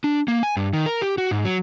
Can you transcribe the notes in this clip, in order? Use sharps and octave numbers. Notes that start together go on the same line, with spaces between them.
D4
A#3
G#5
G2
D#3
A#4
G4
F#4
G#2
F#3